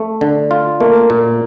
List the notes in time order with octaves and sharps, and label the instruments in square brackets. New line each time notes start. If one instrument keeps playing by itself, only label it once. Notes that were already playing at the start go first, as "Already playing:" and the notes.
Already playing: [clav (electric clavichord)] A3
D3
F4
[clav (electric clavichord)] A3 [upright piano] A#3
[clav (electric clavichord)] A#2